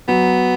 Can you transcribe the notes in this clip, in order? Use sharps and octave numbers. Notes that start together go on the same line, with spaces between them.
F#3 B3